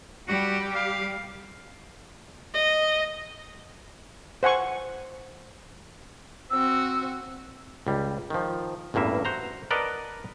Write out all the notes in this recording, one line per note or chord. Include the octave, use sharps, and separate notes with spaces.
G3 F#4 G4
F5
D#5
C5 F#5 G#5 C#6
C4 F#4 E6
C#2 G3
D#3 F3
A1 E2 G2 A#3 E5
F#4 C5 A#5
A#4 B4 D5 D#5 F#5 A5